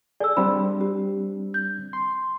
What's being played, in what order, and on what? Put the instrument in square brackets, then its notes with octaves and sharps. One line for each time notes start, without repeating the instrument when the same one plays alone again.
[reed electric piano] G#4 A4 [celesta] D5 E6
[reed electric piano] G3 C4 D4 [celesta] B5
[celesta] G4
G6
[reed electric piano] C6